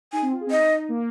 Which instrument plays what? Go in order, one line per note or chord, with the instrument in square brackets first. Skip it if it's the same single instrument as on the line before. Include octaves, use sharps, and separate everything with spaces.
[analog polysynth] D#4 [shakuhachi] G#5
[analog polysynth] C4
F4
G#4
C4
[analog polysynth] D#4 [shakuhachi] D#5
[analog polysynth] A#3